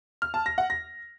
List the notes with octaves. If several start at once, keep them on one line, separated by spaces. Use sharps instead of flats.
F6
A5
A#6
F#5
A#6